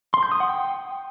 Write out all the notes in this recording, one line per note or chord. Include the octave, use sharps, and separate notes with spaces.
C6
G6
D#6
F#5
G5